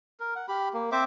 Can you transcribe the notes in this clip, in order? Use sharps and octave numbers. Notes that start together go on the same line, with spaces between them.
A#4
F#5
G4 B5
A#3
C4 C5 E5 D6